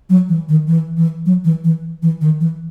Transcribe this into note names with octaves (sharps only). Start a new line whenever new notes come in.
F#3
E3
D#3
E3
E3
F#3
E3
E3
E3
D#3
E3